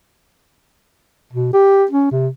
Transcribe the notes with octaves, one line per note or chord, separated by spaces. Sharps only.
B2
G4
C#4
C3